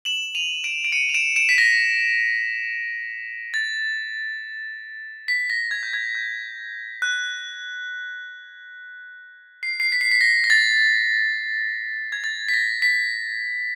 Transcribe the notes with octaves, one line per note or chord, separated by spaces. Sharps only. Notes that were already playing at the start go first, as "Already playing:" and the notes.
E7 F#7
D#7 F7
D7 E7
D7
C#7 D#7
F7
D7 E7
D7 E7
B6
A#6
A6
B6
A#6
G#6
G6
G#6
G6
F#6
C7
C7
B6
C7
B6
A#6
A#6
A6
G#6
A6
B6
A#6
B6